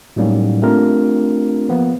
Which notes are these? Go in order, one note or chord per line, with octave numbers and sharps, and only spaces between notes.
A2 F#3 G3 A#3 C#4 D#4
A3 C4 D4 F4 G4 A#4
F3 A#3 B3 B4